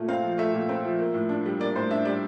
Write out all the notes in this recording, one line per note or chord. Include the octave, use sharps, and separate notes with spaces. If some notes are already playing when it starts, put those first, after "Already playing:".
Already playing: A#2 A3
C4 F5
F3
A3 E5
A#2
C4
F3
A#3
A2
D4
G3
A#3 D5
A2 C5
D4 E5
G3 D5